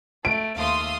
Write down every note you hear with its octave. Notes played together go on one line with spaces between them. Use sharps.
A3 D7
D#2 A3 F5 C6 D#6 E6